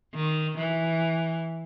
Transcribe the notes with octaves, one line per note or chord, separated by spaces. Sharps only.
D#3
E3